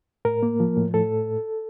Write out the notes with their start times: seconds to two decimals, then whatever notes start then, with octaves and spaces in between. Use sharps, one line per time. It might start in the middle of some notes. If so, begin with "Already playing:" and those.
0.25 A2 A#4
0.43 A#3
0.60 F3
0.77 A2
0.94 A2 A4